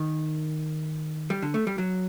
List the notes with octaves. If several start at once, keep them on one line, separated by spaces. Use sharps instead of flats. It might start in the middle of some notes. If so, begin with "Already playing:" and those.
Already playing: D#3
G3
D3
A3
G3
F#3